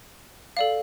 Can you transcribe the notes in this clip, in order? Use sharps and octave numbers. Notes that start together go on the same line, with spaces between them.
A4 D5 F5